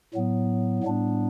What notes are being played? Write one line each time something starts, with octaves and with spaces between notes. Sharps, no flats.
A2 F#3 B3
A2 G3 B3 D4